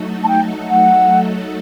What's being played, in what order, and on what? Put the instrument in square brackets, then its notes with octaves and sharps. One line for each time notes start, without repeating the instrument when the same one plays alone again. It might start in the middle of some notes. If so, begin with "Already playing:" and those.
Already playing: [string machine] F#3 A3 D#4 F#4 A4
[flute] A5
G5
F#5